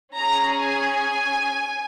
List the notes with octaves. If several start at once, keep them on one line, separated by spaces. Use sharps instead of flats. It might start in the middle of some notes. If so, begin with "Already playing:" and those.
C#4 G#4 A#5
G#5